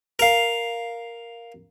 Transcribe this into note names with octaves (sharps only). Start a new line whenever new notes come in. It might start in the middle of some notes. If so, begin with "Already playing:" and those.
A#4 F5